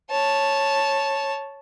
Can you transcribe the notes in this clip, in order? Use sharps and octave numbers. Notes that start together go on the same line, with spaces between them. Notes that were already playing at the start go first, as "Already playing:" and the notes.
C#5 A5